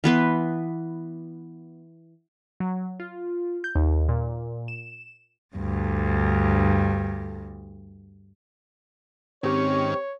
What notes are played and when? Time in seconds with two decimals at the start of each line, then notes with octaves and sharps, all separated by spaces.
0.04 E3 B3 B4 C6
2.60 F#3
3.00 F4
3.64 G6
3.75 D#2
4.08 A#2
4.68 E7
5.55 D2 G2
9.43 G#2 D#3 C4 C#4 G4 C#5 C#6